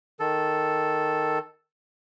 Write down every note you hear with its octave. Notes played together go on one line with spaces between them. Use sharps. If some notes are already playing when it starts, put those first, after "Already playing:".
D#3 A4